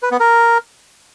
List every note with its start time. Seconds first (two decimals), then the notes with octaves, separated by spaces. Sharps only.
0.03 B4
0.11 B3
0.20 A#4